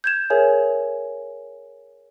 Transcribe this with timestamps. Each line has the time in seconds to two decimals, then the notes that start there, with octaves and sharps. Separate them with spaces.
0.04 G6 G#6 E7
0.30 G#4 A#4 C#5 E5 G#5